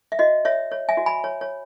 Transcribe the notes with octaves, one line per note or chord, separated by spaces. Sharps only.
E5
F#4 D#5
C#5 E5
C#5
E5 G#5
F#4
G#5 B5
C#5
C#5